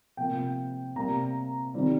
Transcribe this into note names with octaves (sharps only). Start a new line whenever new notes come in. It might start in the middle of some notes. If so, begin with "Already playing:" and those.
C3 F3 A#3 G5
C3 G3 A#3 A#5
D#3 G3 C4